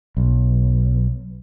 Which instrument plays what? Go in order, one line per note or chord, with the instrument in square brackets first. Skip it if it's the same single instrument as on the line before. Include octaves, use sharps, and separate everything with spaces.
[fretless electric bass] B1